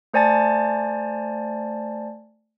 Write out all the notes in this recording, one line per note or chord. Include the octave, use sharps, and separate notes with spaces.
A3 C5 D5 G#5 A5 A6